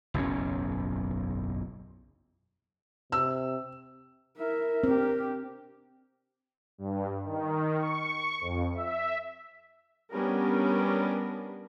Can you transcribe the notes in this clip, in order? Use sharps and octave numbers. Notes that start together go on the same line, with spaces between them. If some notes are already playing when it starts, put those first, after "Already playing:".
F#1 B1 E2 C#4
C3 E6
E4 A#4 E5
C4 D4 G4
G2
D#3
C#6
F2
E5
G3 B3 C#4 D4 G4 A#4